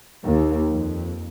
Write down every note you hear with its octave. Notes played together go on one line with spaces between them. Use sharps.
D#2
F2